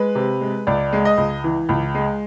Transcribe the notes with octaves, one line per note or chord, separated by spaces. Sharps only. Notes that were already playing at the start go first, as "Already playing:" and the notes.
Already playing: G#3 B4
C3
G#3
C#2 D5
G#3
D#5
C#2
E3
C#2
G#3